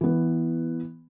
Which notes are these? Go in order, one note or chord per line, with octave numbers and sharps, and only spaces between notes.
E3 B3